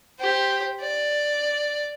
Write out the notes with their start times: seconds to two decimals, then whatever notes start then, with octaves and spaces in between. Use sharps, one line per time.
0.20 G4 C5
0.81 D5